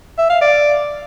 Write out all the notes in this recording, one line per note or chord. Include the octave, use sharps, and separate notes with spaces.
E5
F5
D5